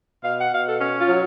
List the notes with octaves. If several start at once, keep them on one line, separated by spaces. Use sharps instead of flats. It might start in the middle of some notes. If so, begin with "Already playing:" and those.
B2 F5
F#5
B2 F5
A4
C#4
F4
F#3